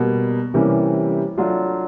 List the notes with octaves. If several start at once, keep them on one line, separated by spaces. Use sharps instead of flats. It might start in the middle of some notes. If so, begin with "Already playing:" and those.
Already playing: B2 G3 A#3
C3 E3 G3 A#3 C#4
F#3 A3 D4 F4